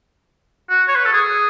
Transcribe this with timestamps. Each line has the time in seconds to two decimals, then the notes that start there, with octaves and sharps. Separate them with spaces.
0.70 F#4
0.88 C#5
0.96 B4
1.05 A4
1.12 G#4